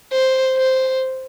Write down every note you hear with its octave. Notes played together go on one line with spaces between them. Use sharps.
C5
C5